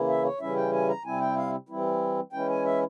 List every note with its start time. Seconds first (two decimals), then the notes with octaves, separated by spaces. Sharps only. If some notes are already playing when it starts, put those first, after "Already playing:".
Already playing: C#3 E3 A#3 E4
0.08 E5
0.24 C#5
0.40 C#3 E3 G3 C#4 E4 E5
0.56 G5
0.73 G#5
0.88 A#5
1.05 C3 G3 C4 E4 G#5
1.20 G5
1.36 F5
1.69 E3 G3 C4 E4
2.32 E3 G#3 C#4 E4 G5
2.49 G#5
2.65 E5